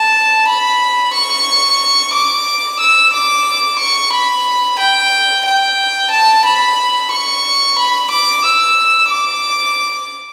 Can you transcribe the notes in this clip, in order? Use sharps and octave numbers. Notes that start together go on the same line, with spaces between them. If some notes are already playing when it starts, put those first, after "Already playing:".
Already playing: A5
B5
C#6
D6
E6
D6
C#6
B5
G5
G5
A5
B5
C#6
B5
D6
E6
D6